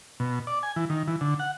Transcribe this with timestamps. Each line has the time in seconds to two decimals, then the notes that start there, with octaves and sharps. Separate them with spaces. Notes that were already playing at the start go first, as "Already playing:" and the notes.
0.20 B2
0.47 D5
0.63 G#5
0.76 E3
0.90 D#3
1.08 E3
1.21 D3
1.39 F#5